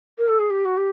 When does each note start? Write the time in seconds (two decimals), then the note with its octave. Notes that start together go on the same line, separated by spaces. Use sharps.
0.18 A#4
0.28 A4
0.39 G#4
0.50 G4
0.65 F#4
0.77 G4